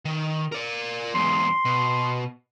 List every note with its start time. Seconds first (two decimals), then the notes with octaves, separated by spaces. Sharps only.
0.05 D#3
0.52 A#4 D5
1.15 E2 G#2 C6
1.66 B2